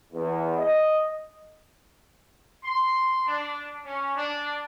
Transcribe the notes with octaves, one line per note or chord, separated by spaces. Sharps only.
E2
D#5
C6
D4
C#4
D4